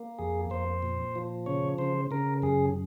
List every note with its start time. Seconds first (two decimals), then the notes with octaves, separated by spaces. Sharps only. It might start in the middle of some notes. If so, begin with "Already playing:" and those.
Already playing: A#3
0.19 F2 G#4
0.50 F2 C5
0.83 A#2
1.15 F3
1.46 C#3 C#5
1.78 C#3 C5
2.11 C#3 A#4
2.42 F#2 G#4